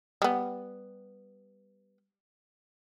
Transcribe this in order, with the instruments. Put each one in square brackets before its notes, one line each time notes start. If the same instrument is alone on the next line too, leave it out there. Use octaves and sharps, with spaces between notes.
[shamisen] G3 B3